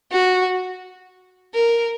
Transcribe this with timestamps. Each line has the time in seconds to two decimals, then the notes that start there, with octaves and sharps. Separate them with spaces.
0.12 F#4
1.54 A#4